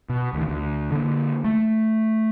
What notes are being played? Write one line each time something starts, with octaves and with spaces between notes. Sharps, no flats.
B2
D2 D#3
D2
D3 A#3
A3